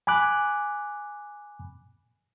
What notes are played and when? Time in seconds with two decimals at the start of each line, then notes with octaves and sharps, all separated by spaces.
0.07 G#5 B5 D6 F#6